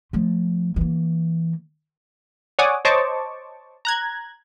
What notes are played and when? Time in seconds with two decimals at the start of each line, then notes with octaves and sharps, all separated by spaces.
0.13 F3 A3
0.76 E3 A#3
2.59 C#5 D5 F#5 G#5 D6 D#6
2.85 C5 C#5 D#5 A5 C#6 D6
3.85 A#5 F#6 G#6